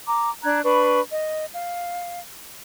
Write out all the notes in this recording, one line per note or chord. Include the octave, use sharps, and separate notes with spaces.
A#5 D6
D4 A#5 F#6 G#6
D4 B4 B5 C#6
D#5
F5